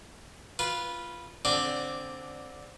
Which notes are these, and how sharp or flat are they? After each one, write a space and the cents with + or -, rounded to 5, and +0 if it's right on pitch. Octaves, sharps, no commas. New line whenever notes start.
F4 -10 B4 -10
D3 -10 C4 +0 D5 +0